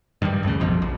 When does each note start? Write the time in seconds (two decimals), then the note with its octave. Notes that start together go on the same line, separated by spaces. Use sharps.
0.22 G2 D#3 F#3 G3
0.43 D1 F2 A2 C#3
0.60 A#1 F2 B2 F3
0.82 A#1